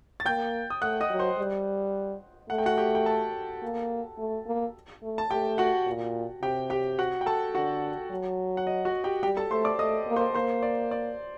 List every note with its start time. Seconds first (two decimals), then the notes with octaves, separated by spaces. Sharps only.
0.20 A6
0.26 A#3 G5 G6
0.70 D#6
0.82 A3 F#5 F#6
1.01 D#5 D#6
1.10 F#3
1.19 C5 C6
1.38 G3
2.50 A3 F#5
2.58 G5
2.66 F#4 F#5
2.78 G4 G5
2.95 G5
3.06 A4 A5
3.63 A#3
4.18 A3
4.46 A#3
5.03 A3
5.18 A5
5.30 A3 G4 G5
5.58 F#4 F#5
5.87 A#2
6.43 C3 G4 G5
6.70 G4 G5
6.99 F#4 F#5
7.21 G5
7.26 A4 A5
7.55 D3 F#4 F#5
8.11 F#3
8.57 F#5
8.67 D#5
8.85 F#4 F#5
9.04 G4 G5
9.23 G3 G4 G5
9.37 A4 A5
9.51 A3 C5 C6
9.65 D5 D6
9.79 A3 D#5 D#6
10.07 A#3
10.16 C5 C6
10.35 A#3 C5 C6
10.63 D5
10.91 D5